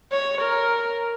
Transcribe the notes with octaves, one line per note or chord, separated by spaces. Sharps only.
C#5
A#4